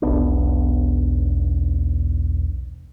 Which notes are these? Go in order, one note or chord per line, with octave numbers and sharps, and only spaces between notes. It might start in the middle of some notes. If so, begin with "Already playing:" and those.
E1 B1 B3 D4